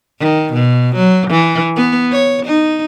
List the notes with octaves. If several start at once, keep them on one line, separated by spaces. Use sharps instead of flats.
D#3
B2
F#3
E3
B3
C#5
D#4